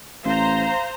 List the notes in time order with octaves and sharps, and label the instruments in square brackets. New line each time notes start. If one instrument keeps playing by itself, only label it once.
[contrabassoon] A1 [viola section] C5 A#5 [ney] F5